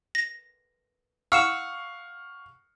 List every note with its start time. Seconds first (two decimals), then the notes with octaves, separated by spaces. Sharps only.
0.15 A#6
1.32 F5 F#5 C#6 E6 C#7 E7